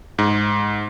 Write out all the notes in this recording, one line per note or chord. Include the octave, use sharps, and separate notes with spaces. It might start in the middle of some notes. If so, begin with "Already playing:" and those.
G#2